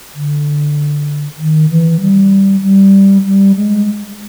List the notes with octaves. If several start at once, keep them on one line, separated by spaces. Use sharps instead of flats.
D3
D#3
E3
G3
G3
G3
G#3